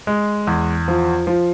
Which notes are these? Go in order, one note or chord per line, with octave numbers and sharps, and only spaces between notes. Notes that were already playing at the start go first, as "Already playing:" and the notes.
G#3
E2
F3
F3